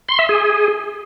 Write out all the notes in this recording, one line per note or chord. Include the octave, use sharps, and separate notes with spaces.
C6
E5
G#4